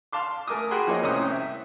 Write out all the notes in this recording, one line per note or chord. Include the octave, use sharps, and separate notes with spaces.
F5 A5 C6 D6
A3 A#4 G#5 D6 D#6
F#4 G#4 G5 G#5 B5 C6
F3 A#3 C#5 D#5
C2 A2 C#4 C5 C6 D#6
E5